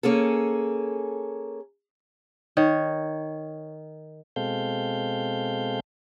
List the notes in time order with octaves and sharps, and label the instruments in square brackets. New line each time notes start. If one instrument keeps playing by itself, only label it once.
[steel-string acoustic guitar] A#3 C#4 G#4 A4
[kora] D#3 C#5
[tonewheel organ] B2 G#3 C4 A4 F5 G6